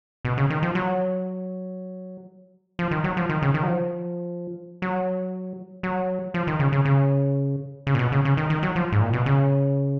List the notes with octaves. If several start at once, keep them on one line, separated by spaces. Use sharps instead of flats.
B2
C#3
D#3
F3
F#3
F3
D#3
F#3
F3
D#3
C#3
D#3
F#3
F3
F#3
F#3
F3
D#3
C#3
C#3
C#3
C#3
A#2
B2
C#3
C#3
D#3
D#3
F#3
F3
G#2
A#2
B2
C#3